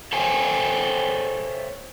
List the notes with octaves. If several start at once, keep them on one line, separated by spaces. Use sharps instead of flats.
A4 C5 C#5 E5 G5 G#5